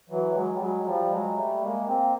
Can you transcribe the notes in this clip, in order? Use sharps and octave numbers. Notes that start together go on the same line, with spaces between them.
E3 F#3
F#3 G#3
G3
F#3 G#3
F3 G3
F#3 G#3
G3 A3
G#3 A#3
A#3 C4